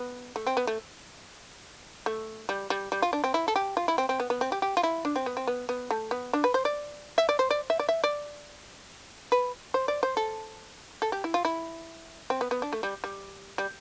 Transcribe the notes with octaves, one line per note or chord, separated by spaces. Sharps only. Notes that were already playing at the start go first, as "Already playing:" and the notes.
Already playing: B3
A3
C4
B3
A3
A3
G3
G3
G3
F4
D4
C4
E4
A4
G4
F4
E4
C4
C4
B3
B3
C4
G4
G4
F4
E4
D4
C4
B3
C4
B3
B3
A3
B3
D4
B4
C5
D5
E5
D5
C5
D5
E5
D5
E5
D5
B4
C5
D5
C5
A4
A4
G4
E4
F4
E4
C4
B3
B3
D4
A3
G3
G3
G3